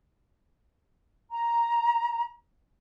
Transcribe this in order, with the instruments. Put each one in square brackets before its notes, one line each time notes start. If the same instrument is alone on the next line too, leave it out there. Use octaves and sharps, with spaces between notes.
[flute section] A#5